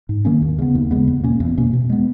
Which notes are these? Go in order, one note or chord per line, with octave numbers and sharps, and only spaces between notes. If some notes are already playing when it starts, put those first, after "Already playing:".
G#2
D#3 A#3 C#4
D#2
C#3 G#3 B3
D#2
C#3 G#3 B3
E2
B2 A#3 C#4
E2
B2 A#3 C#4
B2
G#3 B3